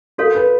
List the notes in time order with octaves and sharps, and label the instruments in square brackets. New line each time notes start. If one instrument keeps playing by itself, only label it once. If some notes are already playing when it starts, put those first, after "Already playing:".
[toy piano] F#4 A4 C#5 F5 [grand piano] A#4
[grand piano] B4